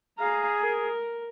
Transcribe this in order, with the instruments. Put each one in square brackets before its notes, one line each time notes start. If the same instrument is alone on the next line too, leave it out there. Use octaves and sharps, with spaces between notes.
[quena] G#4 [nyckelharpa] F5 A#5
[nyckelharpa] A#4